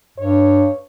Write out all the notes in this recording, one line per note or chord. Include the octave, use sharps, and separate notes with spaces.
G2 C#5